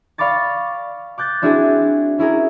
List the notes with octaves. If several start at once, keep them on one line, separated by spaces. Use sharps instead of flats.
D5 F5 B5 C#6 D6 A6
D6 F#6 G6 A6
C4 D4 E4 F#4 G#4
C#4 E4 G#4 A#4